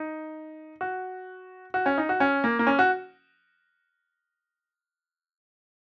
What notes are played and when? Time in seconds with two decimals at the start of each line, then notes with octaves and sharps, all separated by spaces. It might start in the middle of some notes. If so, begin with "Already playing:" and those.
Already playing: D#4
0.81 F#4
1.74 F#4
1.86 C#4
1.98 D#4
2.09 F#4
2.20 C#4
2.44 A#3
2.59 A#3
2.67 C#4
2.79 F#4